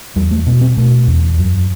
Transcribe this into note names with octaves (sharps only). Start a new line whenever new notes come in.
E2 G3
A3
B2 B3
C4
B2 A3
E2
F#2